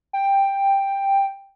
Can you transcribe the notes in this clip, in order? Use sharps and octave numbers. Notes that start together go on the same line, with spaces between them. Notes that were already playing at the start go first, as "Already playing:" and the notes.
G5